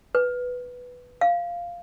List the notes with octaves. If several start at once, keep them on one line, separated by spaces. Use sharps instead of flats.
B4
F5